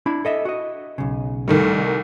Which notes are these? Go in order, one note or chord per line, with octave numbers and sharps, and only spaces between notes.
D4 E4 B5
A4 D#5 E5
F#4 D#5
B1 C#3
C2 D#3 G3 A3